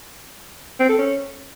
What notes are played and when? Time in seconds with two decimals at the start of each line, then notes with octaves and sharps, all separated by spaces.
0.79 C4
0.89 A4
0.98 C#4